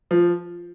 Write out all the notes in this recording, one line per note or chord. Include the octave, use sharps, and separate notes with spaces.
F3